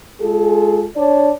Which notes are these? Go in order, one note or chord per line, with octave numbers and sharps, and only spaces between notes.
G#3 F4 G#4 A4
D4 C#5 D5